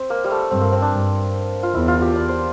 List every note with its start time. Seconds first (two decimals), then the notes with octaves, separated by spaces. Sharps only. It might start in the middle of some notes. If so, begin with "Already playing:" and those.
Already playing: C4
0.10 A#3
0.24 G3
0.31 A3
0.51 G2 C4
0.61 A#3
0.72 C4
0.82 D4
0.92 G2
1.63 F4
1.74 E2 E4
1.88 F4
2.02 G4
2.15 D5
2.28 C5